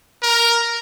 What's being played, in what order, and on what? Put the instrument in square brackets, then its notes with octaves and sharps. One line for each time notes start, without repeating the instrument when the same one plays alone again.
[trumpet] A#4